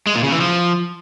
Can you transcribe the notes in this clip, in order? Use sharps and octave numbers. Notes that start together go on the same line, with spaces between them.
G#3
A#2
C#3
E3
F3